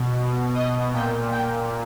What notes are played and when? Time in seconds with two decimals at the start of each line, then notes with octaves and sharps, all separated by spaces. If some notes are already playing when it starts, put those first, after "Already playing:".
Already playing: B2
0.55 D#5
0.93 A#2 G5
1.31 G5